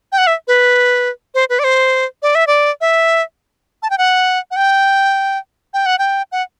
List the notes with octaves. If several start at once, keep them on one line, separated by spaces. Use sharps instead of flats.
G5
F#5
E5
B4
C5
B4
D5
C5
D5
E5
D5
E5
A5
G5
F#5
F#5
G5
G5
F#5
G5
F#5